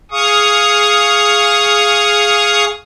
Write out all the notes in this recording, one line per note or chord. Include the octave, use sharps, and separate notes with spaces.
G#4 F5 C#6 D#6